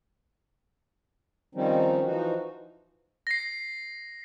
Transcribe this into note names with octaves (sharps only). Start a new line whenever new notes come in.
D#3 F3 G3 C4 C#4 D#4
E3 F3 D#4 F#4
A#6 C7